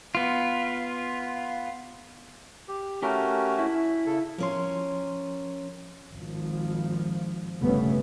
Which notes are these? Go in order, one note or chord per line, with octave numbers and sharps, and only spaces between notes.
B3 F4
G4
A3 C#4 F#4 G4 A#4
E4
C#3 A4
F3 C#4 A#4 C6
G#1 F3
G1 G2 C#3 A3 B3 C#4